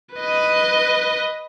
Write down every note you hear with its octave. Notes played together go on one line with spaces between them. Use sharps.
B4 D#5